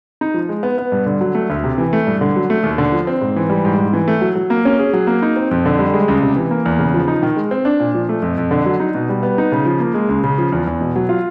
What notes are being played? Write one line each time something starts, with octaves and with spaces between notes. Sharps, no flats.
D#4
F3
G#3
B3
B3
G2
D3
F#3
A3
D2
C3
E3
A3
G2
D3
F#3
A3
D#2
D3
F3
C4
G#2
E3
G3
G#2
G#2
E3
A3
F#3
F#3
A#3
C#4
G#4
F#3
A#3
D#4
C4
F2
D3
G3
G#3
C#2
C3
E3
A#3
E2
C#3
F3
D#4
D#3
G#3
C4
D4
A#2
F3
A3
F2
F2
D3
F#3
D#4
B2
G3
B3
D#4
C#3
F3
A#3
G#3
C#2
C#3
F3
E2
E2
B2
F#3
F4